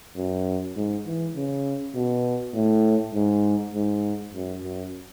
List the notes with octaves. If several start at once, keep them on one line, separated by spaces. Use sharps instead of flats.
F#2
G#2
E3
C#3
B2
A2
G#2
G#2
F#2
F#2